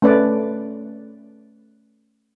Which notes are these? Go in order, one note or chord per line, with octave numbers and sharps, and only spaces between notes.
A3 C#4 B4 D5